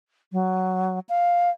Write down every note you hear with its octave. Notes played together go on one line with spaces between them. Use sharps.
F#3
F5